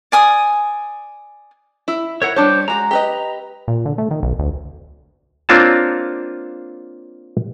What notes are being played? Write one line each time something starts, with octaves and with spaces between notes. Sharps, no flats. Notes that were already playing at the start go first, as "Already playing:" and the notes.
D5 G#5 D#6
E4
E4 A#4 C#5 F#5
G3 D4 C5 C#5 D6
G#3 F#4 A#5
G4 B4 D#5
A#2
D3
A3
D#3
B1
D2
A#3 C4 D4 F4 C#5 A5